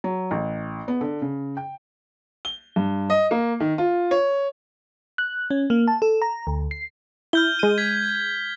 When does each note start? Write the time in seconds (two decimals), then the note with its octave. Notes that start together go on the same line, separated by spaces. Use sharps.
0.04 F#3
0.31 A1
0.88 B3
1.01 D3
1.21 C#3
1.57 G5
2.45 G7
2.76 G2
3.10 D#5
3.31 A#3
3.60 D#3
3.78 F4
4.11 C#5
5.18 F#6
5.51 C#4
5.70 A#3
5.88 A5
6.02 A4
6.22 A#5
6.47 D2
6.71 C7
7.33 E4 F6 G6 G7
7.59 G#3 D#7
7.78 G#6 B6